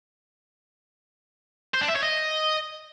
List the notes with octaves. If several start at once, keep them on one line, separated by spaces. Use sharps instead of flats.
C5
D4
E5
C#5
D#5